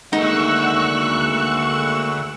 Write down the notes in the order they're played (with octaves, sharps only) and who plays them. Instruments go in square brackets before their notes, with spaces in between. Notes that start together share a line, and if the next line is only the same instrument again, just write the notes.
[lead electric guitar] D2 F#5 [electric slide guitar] G#3 A#3 [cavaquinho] D#4 [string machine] C#6 E6 F#6